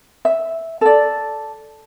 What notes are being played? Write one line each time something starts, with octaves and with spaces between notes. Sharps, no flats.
E5
A4 D5